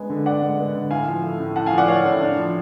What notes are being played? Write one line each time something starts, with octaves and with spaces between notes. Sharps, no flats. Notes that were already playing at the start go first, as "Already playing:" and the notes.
Already playing: G#3 B3 D4 G#5
D3
D4 D5 F#5
G#3
B3
D3
A2 F5 G#5
F3
A3
A2
A2 F#5 A5
F5 G#5
F3
D5 F#5
A3 C#5 F5
A2
D4
F3